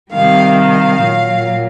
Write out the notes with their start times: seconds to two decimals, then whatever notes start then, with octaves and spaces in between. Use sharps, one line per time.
0.11 C3 D#3 G3 F5
0.57 F5
1.01 A#2 F#3